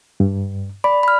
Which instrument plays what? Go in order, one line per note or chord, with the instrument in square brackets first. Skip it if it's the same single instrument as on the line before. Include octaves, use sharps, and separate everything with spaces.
[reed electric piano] G2
[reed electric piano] D5 [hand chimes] B5
[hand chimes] B5 F6